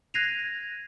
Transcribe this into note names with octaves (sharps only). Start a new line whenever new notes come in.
F#6 G#6 A#6 C7 D#7 F7